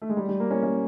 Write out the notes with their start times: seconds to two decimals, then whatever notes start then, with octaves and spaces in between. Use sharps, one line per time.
0.02 A3
0.09 G#3
0.17 G3
0.29 G3
0.40 A#3
0.51 C#4
0.63 C#4